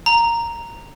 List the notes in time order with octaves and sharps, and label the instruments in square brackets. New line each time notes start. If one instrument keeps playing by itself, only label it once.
[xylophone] A#5